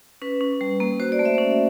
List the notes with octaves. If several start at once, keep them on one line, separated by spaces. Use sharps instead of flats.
C#4 B4
C#4
G3
A#3
F#4 C5
D5
A3
E5
C#4